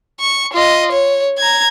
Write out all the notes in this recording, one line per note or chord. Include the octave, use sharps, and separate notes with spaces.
C#6
F4 D#5
C#5
A#5 G#6